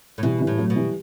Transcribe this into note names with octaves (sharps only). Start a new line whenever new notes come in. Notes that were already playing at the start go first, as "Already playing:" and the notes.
A2
B2 E3 G3
E3 G3
A2
F#3 A3
B2
E3 G3